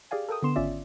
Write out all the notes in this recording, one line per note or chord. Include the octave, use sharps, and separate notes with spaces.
G4 G#4 D5 F5 G#5
A4 A#4 G5 D#6
D3 B3 C6 E7
G#1 C#4 F4 D5 E5